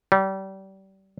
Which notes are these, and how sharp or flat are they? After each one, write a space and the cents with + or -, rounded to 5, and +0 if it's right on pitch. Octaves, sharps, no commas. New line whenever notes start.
G3 -30